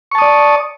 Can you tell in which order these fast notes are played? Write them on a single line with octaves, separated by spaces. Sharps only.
C#6 A5 D#6 D5